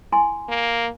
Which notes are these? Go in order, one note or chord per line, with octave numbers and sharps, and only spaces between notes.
E4 G#5 C6
A#3